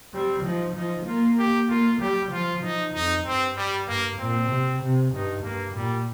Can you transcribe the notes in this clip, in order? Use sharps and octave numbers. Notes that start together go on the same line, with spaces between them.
G3 C4
F3 D#4
F3 D#4
A#3 F4
G4
A#3 F4
G3 G4
F3 F4
F3 D#4
F2 D#4
G2 C4
G3
G2 A#3
A#2 C4
C3
C3
G2 D#4
G2 A#3
A#2 G3